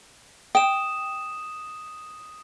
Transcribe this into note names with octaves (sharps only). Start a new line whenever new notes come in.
G5 D#6 E7